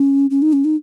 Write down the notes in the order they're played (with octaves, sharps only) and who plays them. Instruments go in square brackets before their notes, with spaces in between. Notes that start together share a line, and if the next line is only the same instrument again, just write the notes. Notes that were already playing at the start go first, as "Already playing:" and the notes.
Already playing: [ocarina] C#4
C#4
D#4
C#4
D#4